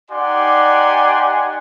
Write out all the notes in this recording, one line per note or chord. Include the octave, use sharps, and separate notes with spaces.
D#4 G4 D5 F#5 G#5 C6